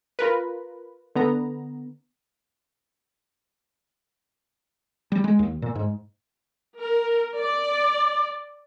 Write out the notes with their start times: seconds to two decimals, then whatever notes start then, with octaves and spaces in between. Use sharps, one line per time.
0.19 F4 A#4 B4
1.15 D3 B3 A#5
5.12 G3
5.24 G#3
5.39 D#2
5.62 A#2
5.75 G#2
6.78 A#4
7.38 D5